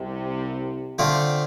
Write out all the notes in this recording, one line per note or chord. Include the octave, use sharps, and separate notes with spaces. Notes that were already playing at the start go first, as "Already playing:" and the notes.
Already playing: C2 C3
D3 A3 C4 F4